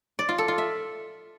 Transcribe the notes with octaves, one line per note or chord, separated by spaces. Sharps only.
D5
F4
A4
F4
E5